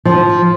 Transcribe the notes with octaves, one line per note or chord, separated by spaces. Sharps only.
F3